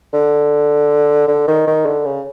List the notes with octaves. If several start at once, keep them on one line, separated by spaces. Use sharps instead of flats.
D3
D3
D#3
D#3
D3
C#3